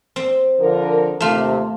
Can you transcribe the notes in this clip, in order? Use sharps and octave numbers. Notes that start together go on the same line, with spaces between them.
C4
D3 F3 A#4
D#2 C3 A3 F4